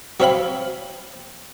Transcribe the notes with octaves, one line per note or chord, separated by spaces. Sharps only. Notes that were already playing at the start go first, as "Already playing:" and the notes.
F#3 C4 E5 F5 G5 B5